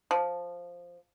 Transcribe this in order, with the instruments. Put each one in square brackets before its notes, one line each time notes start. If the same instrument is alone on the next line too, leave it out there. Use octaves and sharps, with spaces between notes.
[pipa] F3